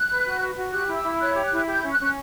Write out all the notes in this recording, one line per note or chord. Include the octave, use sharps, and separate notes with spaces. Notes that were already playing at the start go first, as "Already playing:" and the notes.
Already playing: F#6
B4
F#4
B4
F#4
G4 F#6
E4
E6
E4
C#5 F#6
G4
F#6
E4
G4 G6
C#4
F#6
C#4